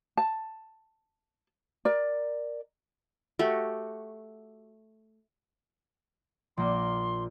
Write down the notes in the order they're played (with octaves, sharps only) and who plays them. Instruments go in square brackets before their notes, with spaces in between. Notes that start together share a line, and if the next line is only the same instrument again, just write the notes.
[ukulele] A5
A#4 D5
[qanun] A3 F#4 G4
[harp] A#1 A#3 D6 [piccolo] C6